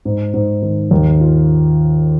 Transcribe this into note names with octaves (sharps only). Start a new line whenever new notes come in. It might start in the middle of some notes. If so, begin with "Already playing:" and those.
G#2
G#2
D#3
D#2
F4